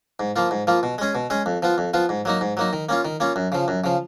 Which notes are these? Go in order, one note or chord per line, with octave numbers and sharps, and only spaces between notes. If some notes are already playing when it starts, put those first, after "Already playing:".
G#2
F3 A#3 F4
G#2
F3 A#3 F4
B2
G#3 C#4 G#4
B2
G#3 C#4 G#4
F2
F3 B3 F4
F2
F3 B3 F4
G#2
F#3 A#3 D#4
G#2
F#3 A#3 D#4
D#3
A#3 C#4 F4
D#3
A#3 C#4 F4
F#2
C#3 F3
F#2
C#3 F3